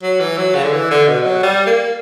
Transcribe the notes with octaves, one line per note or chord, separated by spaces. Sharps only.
F#3
E3
F#3
C#3
D3
E3
D3
B2
F#3
G3
A#3